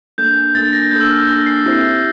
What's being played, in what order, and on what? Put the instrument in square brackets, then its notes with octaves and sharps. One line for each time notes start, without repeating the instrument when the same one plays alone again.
[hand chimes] A#3 D4 A4 [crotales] G6
[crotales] G6
[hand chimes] A#3 D4 A4 [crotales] A6
[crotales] A#6
[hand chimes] A#3 D4 A4 [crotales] G6
[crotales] E6
F6
G6
[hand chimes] A#3 D4 A4 [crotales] A#6
[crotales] C7
[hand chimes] C4 E4 G4 C5 E5